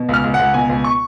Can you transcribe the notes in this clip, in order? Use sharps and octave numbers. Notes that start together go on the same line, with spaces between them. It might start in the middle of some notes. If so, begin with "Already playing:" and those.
Already playing: B2
C#2
F6
C#2
C#2 F#5
B2 G#5
C#2
C#6